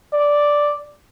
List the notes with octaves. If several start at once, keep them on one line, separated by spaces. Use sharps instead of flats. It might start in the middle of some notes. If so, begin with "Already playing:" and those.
D5